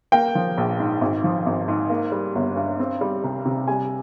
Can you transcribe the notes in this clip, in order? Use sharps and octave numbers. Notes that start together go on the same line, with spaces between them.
A#3 G5
F3
A#1
G#2
G#1
F3
G#1
G#2
A#3
G3
G1
G2
C4
G3
C2
C3
G3 G#5